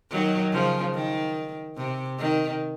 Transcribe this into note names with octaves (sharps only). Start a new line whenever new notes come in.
D#3 F#3
C#3 F3
D#3
C3
D#3